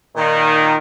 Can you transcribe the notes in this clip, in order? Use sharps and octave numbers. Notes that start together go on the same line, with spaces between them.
A#2 D#3